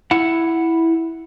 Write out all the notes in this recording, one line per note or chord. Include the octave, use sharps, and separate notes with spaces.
E4 F#5